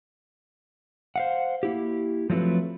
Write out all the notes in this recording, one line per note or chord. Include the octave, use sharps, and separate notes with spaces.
C5 F5 F#5
A#3 E4 G4
F3 F#3 A3 C4 B4